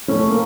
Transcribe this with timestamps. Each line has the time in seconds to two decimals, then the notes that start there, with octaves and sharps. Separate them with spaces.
0.08 A3 C#4
0.30 A#3